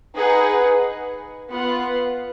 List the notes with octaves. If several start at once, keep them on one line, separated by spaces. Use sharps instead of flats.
D#4 G#4 B4 F#5
B3 F4 B4 F#5